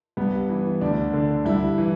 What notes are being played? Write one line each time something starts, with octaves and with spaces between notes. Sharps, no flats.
G2 B3
E3
D2 D4
D3
G2 E4
E3